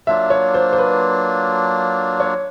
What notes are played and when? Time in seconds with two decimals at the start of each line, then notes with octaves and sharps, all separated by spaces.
0.07 F#3 A#3 D4 F4 E5
0.30 C#5
0.54 C5
0.73 C5
0.78 B4
2.20 C#5